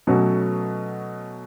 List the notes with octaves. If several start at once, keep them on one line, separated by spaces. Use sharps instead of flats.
B2 F#3 A3 C#4 F#4